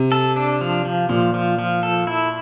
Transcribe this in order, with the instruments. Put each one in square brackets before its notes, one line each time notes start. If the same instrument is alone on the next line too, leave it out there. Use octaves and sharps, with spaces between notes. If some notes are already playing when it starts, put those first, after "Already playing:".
Already playing: [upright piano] C3
[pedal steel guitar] A4
D4
F3
F3
[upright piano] A#2 [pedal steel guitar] F3
[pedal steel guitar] F3
F3
A4
E4